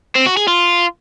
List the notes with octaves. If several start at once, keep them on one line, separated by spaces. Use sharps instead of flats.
C4
F#4
G#4
F4